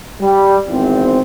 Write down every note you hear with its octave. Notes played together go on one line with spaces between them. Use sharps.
G3
G#1 E2 C4